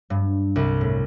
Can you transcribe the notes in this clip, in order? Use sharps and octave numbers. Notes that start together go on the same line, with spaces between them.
G2
C2
A2